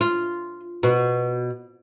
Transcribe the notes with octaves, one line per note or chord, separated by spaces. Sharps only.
F4
B2